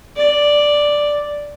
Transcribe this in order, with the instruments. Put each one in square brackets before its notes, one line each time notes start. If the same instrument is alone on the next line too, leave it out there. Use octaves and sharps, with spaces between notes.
[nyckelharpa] D5